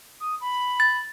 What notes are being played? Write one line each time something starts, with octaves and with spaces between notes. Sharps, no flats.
D#6
B5
A6